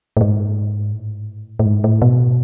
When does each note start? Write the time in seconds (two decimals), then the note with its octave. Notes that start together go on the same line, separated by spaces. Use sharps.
0.17 A2
0.21 G#2
0.93 A2
1.59 A2
1.66 G#2
1.84 A2
2.02 B2